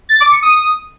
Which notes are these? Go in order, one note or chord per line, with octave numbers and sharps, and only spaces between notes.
A6
D6
C#7
D#6